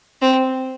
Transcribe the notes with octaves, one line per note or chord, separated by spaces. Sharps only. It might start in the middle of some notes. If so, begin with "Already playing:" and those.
C4